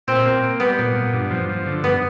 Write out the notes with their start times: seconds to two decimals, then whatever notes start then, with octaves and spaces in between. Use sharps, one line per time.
0.08 A#2 C4
0.26 A#3
0.42 A#3
0.60 G3 B3
0.79 A#2
0.96 A#2
1.13 G2
1.31 F3
1.49 F3
1.66 D3
1.83 G2 B3